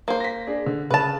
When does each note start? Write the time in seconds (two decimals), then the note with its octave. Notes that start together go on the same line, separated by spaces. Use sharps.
0.08 A#3 C5
0.20 A#6 B6
0.47 D4 G#4
0.66 D3
0.90 C#3 B4 A5 E7